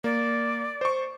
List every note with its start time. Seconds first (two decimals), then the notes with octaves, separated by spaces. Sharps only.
0.04 A#3 D5
0.81 C5 C#6